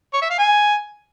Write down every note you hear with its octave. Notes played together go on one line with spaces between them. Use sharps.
C#5
E5
F5
G#5